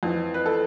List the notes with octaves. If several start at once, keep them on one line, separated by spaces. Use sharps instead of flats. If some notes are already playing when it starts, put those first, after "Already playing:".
F2 E3
B4
A4